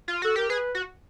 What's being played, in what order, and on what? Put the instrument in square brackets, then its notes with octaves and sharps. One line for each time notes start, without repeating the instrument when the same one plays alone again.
[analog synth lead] F4
[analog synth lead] F#4 [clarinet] A4
[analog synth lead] G4 [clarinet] A#4
[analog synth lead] G#4 [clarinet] B4
[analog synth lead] F#4